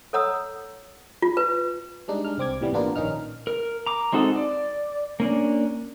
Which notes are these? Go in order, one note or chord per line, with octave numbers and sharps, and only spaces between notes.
A4 C#5 F#5 A#5 D#6 E6
F4
B4
G3 G#3 D4 D#4
G#3 D4 F6
C2 C4 D6 G#6
A2 C3 E3 G3 B3
A1 A#2 B3 D4 F4 A#4
A#1 D#3 C#4 D#4 F6
A#4
A#5 D6
G#3 C4 D#4 F#4 A4
D5
A#3 C#4 D4